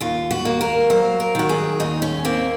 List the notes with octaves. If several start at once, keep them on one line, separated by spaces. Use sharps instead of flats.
D#2 F4
F#4
A#3
A#4
F#3 C5
A#4
D#3 F#4
G#4
D#2 D#4
C#4
A#3 C4